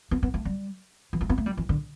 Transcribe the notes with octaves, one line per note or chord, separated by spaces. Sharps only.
B3
B3
A3
G3
E3
A3
B3
A3
G3
E3
D3